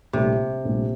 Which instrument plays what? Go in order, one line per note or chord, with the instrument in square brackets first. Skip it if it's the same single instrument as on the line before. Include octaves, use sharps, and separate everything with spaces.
[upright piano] A#1 A2 G3 [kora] C3
[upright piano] A#1 A2 G3